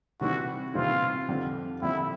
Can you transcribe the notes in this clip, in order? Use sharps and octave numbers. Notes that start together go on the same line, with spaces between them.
C3 E3 G3 C4 E4 F#4
C3 E3 G3 C4 E4 F4
F2 D3 G3 C4
F2 D3 G3 C4 E4